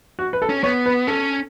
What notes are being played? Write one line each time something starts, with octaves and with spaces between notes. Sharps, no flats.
F#4
B4
A4
C#4
B3 C#5
B4
C#4 A4